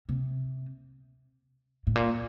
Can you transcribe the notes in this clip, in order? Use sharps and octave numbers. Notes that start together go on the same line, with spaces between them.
C3
A2
A#2